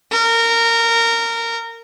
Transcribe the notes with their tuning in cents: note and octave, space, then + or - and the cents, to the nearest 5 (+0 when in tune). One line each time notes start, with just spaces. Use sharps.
A#4 -20